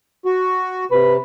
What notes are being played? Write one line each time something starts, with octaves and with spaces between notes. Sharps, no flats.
F#4
C3 B4